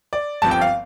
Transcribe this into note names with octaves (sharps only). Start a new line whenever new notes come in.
D5
G1 G2 F3 C4 A5
G5
F5